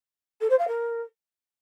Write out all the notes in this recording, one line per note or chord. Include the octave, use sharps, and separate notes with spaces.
A4
C5
F5
A#4